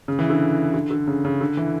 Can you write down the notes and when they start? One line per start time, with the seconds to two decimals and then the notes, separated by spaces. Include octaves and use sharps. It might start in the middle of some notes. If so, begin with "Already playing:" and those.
0.08 C#3
0.19 E3
0.30 D3
0.74 D3
0.91 D3
1.07 C#3
1.25 C#3
1.41 D3
1.57 E3